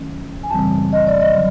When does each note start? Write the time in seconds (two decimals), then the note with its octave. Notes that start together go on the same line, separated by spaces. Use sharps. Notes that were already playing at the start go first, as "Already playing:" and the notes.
Already playing: D#3 F#3 A3 C#4 E4
0.43 G#5
0.50 F#2 C#3 E3 G3 C4 A5
0.93 D#5
1.07 D5
1.20 D#5
1.35 D3 F#3